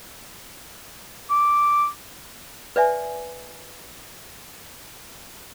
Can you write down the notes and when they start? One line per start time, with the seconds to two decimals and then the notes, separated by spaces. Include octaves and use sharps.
1.30 D6
2.76 B4 D5 E5 G#5